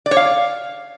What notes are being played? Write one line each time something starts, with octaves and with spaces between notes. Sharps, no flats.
D5
C#5
F5